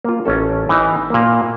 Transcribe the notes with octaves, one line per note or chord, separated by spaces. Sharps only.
A#3 F4
A1 C#4 A4
E3 D#4
A#2 A#3